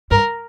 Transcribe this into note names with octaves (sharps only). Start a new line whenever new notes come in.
G2 A#4